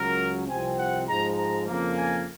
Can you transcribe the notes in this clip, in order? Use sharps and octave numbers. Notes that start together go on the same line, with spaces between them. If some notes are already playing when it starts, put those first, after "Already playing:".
Already playing: C#2 C#3 F#3 A#4
C2 C3 F3 C4 G#5
F#5
G#2 F3 G#3 A#5
A#5
F2 C#3 F3 A#3
G#5